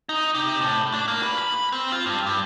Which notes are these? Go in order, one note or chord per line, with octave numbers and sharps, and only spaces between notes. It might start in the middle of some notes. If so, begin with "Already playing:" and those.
D#4
C3
A2
D4
A#3
B4
B5
C4
F4
G2
G2